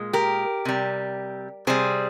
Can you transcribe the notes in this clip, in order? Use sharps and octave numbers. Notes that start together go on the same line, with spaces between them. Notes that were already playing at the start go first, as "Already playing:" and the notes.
Already playing: A#2 G#3
G4 A#4
C3 G3
C3 G3 G#4 C5